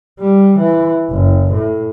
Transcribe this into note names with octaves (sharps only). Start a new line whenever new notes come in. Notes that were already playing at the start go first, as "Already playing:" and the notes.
G3
E3
F#1
A2